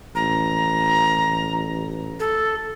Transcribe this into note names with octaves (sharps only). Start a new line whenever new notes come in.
A1 A#5
A4